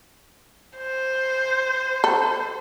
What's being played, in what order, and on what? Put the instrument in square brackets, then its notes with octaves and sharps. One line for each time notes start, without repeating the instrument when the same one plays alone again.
[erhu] C5
[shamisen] A4